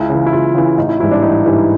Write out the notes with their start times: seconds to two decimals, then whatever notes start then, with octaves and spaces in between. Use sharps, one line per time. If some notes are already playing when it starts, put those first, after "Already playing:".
Already playing: C#2 E4
0.09 C#3 E3
0.26 E4
0.33 C#2 F4
0.55 C#3 E3
0.78 A1 D#4
0.89 E4
1.00 G#2 E3 G3 E4
1.11 D4
1.22 A1 D#4
1.45 G#2 E3 G3 E4